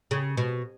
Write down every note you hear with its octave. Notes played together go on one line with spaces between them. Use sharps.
C#3
B2